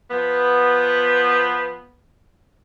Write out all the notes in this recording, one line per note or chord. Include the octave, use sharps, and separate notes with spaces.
F3 B3